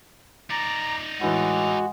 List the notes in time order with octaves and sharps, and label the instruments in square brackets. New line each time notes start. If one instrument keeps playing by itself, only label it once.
[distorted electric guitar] D#4 D5 [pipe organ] A#5
[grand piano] A2 E3 [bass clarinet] G#3 [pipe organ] F#4